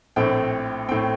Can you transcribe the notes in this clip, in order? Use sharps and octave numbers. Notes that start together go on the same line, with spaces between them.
A#1 A2 A3 C4 G5
A2 A3 C4 G5